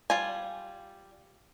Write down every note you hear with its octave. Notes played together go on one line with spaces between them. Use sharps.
G3 F4 G#5